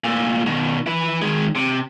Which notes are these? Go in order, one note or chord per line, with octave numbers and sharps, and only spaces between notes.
A#2 A3
B2 D#3
E4 B4
D#3 G#3
C3